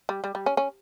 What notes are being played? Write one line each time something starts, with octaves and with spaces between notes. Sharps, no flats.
G3
G3
G3
C#4
C#4